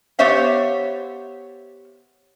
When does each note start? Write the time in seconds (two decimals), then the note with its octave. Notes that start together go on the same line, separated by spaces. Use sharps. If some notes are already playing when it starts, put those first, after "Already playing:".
0.19 B3 G4 C5 C#5 E5 F5